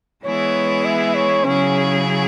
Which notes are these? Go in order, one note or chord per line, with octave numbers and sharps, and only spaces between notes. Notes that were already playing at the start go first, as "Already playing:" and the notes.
E3 G#3 B3 E4 G#4 C#5
E5
C#5
C#3 F#3 C#4 E4 G#4